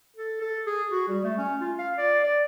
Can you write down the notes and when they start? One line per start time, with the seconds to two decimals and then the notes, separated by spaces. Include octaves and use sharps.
0.16 A4
0.41 A4
0.66 G#4
0.91 F#4
1.09 G3
1.24 A3
1.38 C#4
1.60 F4
1.79 F5
1.98 D5
2.24 D5